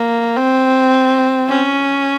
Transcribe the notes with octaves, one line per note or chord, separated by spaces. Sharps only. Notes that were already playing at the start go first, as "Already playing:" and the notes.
Already playing: A#3
C4
C#4